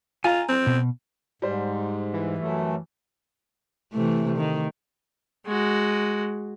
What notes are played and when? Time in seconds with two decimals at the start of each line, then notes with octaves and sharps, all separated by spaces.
0.24 F4 G#5 A#5
0.49 C4
0.67 B2
1.42 G#2 G3 C5
2.14 E3
2.38 F#2 A3
3.93 C3 E3 A3
4.37 D#3
5.46 G#3 F#4